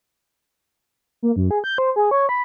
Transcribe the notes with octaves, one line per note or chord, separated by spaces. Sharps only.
A#3
F#2
G#4
G6
C5
G#4
C#5
B5